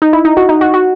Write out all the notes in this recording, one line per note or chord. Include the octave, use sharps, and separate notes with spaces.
D#4
E4
D#4
F#4
D#4
F#4
F#4